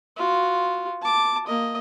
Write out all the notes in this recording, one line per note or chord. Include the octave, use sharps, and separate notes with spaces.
F4 F#4
A5 D6
A#3 D#5